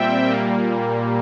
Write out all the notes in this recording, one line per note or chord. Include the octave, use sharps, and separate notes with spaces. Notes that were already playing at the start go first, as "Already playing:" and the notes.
Already playing: A#2 G3 C4 E5 G5
A#2 G3 A#3